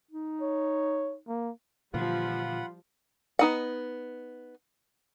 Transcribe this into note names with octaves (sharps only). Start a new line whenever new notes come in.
D#4
C#5
A#3
A#2 D3 E3 F3 G3 F4 F#5 B5
B3 D#4 F#5